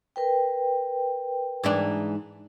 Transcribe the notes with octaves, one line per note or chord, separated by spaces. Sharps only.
A#4 B4 G5
G#2 E3 D4